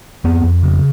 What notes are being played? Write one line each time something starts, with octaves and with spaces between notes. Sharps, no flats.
F2 B3
F2
C#3